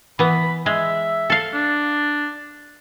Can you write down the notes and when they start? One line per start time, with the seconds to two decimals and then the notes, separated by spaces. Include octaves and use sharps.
0.19 E3 B3 B5
0.66 G#3 E5
1.30 A4 F5
1.53 D4